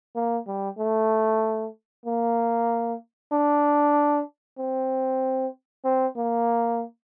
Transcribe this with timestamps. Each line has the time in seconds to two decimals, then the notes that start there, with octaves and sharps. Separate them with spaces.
0.16 A#3
0.47 G3
0.78 A3
2.06 A#3
3.32 D4
4.58 C4
5.85 C4
6.17 A#3